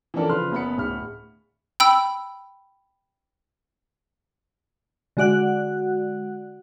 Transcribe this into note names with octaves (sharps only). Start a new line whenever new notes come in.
E3 F3 C#4 D4 A4 A#4
C#3 F3 B4 B5 C6 F6
F#1 B3 B5 C#7
D1 B5 F6
G5 B5 E6
D3 G#3 F#4 D5 F#5 F#6